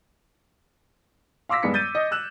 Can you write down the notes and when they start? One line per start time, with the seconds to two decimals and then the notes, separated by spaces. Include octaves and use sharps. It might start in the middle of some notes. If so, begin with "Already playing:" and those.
1.49 F5 C6 D6 E6 A#6 B6
1.62 G2 G#3 B3 B6 C#7
1.74 G6 A6 D#7
1.95 D#5
2.11 E6 F#6 E7